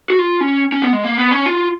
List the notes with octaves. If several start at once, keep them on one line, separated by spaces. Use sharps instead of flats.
F#4
F4
C#4
C#4
B3
G#3
A#3
B3
C#4
F4